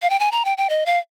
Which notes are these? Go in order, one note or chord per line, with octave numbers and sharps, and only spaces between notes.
F5
G5
G#5
A#5
G5
G5
D#5
F5